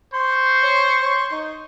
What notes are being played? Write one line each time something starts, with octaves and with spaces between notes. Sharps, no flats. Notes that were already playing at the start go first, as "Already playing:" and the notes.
C5 C6 C#6
C#5
C#5
D#4